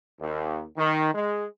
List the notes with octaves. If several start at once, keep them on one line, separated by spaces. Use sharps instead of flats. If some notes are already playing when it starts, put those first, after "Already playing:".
D#2
D#3
G#3